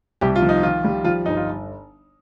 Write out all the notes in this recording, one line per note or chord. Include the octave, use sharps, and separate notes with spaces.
C2 G4
F4
F3
D#4
D#3 F4
G3
F3 F4
G1 D#4
F4